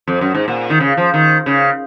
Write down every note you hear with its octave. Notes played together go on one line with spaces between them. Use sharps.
F2
F#2
G#2
A#2
D#3
C#3
F3
D#3
C#3